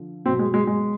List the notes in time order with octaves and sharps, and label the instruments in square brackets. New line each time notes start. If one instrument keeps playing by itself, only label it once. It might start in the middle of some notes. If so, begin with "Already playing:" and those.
Already playing: [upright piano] D3 F3
B1 B2 C4
G#3
G#3
G#3